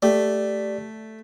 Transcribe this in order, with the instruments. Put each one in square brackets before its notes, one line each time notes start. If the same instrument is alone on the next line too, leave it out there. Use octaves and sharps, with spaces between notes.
[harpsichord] A3 [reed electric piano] G4 D5